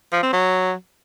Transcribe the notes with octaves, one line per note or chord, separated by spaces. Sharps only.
F3
C4
F#3